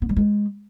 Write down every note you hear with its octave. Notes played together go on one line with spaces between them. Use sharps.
B3
G3
G#3